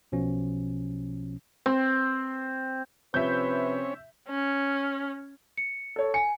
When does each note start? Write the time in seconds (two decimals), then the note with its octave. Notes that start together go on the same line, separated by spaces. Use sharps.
0.12 B1 B2 F3 C#4
1.66 C4
3.14 C3 F3 C4 C#4 B4 C#5 E5 G6
4.29 C#4
5.57 C#7
5.96 A4 C#5
6.14 G#5 C#7